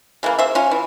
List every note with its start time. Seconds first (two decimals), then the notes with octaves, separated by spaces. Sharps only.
0.23 C#3 E3 A#3
0.39 C5 E5
0.55 C#4 F4
0.71 E3